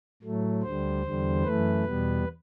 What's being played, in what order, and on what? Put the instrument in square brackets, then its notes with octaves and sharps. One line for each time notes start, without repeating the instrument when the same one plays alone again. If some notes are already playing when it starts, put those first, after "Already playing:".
[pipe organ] A2 F#3 A3
D2 D3 G3 C5
E2 D3 G3
F#2 E3 A3 B4
E2 B2 G3 B3